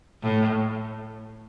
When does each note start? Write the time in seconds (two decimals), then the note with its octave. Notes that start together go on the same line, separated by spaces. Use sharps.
0.23 A2